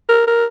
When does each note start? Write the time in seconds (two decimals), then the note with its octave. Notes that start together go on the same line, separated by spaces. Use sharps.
0.09 A#4
0.27 A#4